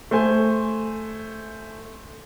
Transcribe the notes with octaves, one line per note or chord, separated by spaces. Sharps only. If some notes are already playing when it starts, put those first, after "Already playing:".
A3 C5 G#5